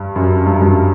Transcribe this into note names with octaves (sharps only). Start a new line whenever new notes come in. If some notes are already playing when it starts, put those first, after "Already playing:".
Already playing: G2
F#2
G2
F#2
G2